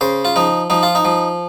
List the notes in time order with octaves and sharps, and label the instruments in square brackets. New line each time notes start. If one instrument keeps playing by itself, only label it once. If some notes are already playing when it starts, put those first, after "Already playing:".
[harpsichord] C#3 C5
F4
F3 D#4
F3 D#4
F4
D#4
F3